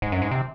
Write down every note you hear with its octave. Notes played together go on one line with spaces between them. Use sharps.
G#2
F#2
G#2
C3